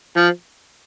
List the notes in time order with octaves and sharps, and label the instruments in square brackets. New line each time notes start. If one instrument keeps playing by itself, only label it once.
[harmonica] F3